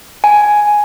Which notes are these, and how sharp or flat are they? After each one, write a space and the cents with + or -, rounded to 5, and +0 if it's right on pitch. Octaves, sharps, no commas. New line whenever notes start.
G#5 +5